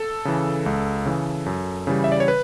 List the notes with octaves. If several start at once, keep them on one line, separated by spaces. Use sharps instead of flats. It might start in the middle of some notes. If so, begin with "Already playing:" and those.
Already playing: A4
C#3 E3
C#2
C#3 E3
F#2
C#3 E3 G3
E5
D5
C#5
B4